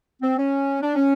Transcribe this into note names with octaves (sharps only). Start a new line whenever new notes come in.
C4
C#4
D4
C#4